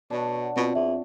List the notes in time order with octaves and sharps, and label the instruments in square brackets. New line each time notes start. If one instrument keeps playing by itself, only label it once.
[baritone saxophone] B2 [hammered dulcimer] D4 C#5
[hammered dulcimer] F#5
[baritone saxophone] B2 [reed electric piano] C4 F4
[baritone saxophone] E2 [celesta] E5